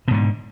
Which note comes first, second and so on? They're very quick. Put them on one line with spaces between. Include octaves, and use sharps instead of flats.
B2 G#2 D3